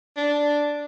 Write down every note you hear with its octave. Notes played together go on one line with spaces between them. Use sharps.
D4